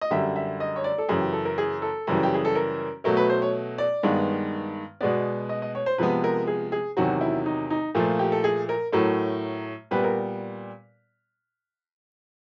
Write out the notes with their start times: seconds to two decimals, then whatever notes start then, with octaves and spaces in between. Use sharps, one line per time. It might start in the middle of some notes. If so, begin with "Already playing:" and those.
0.01 D#5
0.11 F#2 D3 G3 E5
0.36 E5
0.60 D#5
0.76 C#5
0.84 D5
0.98 A4
1.08 F#2 C#3 E3 G#4
1.21 G4
1.33 A4
1.45 A#4
1.58 G#4
1.82 A4
2.07 F#2 C#3 E3 G3
2.23 G4
2.34 G#4
2.45 A4
2.55 A#4
3.04 B2 F#3 A3 A#4
3.17 B4
3.30 C5
3.42 C#5
3.78 D5
4.03 G2 D#3 G#3 B3
5.01 B2 G#3 B3 D5
5.49 D#5
5.62 D#5
5.75 C#5
5.86 C5
5.98 C3 F3 G#3 B3 B4
6.24 A#4
6.47 G#4
6.72 G#4
6.97 E2 C3 D#3 F#3 F#4
7.21 E4
7.46 D#4
7.70 D#4
7.95 A#2 F3 A3 F4
8.19 G4
8.32 A4
8.44 G#4
8.69 A#4
8.92 A2 F#3 A3 A#4
9.91 A#2 G3 B3 B4
10.04 A#4